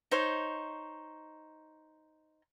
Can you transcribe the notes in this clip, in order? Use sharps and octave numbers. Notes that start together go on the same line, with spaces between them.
D#4 C5 C#5